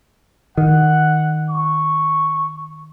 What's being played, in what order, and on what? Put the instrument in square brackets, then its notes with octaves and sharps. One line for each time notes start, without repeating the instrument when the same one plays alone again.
[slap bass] D#3 [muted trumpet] F#5
[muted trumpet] C#6